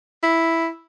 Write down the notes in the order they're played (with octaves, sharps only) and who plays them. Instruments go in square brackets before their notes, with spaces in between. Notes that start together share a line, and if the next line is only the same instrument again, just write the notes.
[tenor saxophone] E4